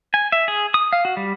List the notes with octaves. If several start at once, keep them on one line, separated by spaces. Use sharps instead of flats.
G#5
E5
G#4
D#6
F5
F#4
G3